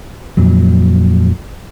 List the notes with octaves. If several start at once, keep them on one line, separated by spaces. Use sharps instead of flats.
F2 A#2 F#3